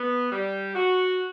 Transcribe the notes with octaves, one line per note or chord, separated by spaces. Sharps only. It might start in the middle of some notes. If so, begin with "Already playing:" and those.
Already playing: B3
G3
F#4